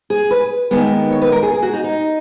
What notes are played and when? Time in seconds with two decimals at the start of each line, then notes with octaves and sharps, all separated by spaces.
0.10 G#4
0.31 B4
0.71 D#2 D#3 G#3 B3
1.12 C#5
1.22 B4
1.32 A#4
1.43 G#4
1.53 G#4
1.63 F#4
1.73 D#4
1.84 D#4